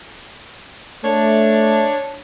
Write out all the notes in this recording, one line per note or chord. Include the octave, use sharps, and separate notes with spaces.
A3 D4 C#5